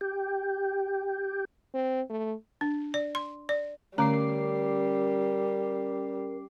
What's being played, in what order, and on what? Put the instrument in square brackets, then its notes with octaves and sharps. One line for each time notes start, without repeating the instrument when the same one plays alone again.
[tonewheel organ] G4
[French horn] C4
A3
[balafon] D4
D5
C6
D5
[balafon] D3 A3 A#5 [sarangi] G3 [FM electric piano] C#4 D6 C7 [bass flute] A#4